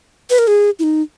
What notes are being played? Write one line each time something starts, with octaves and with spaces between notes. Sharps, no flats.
B4
A#4
G#4
E4
D#4